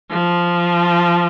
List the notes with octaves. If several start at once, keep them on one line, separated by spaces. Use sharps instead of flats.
F3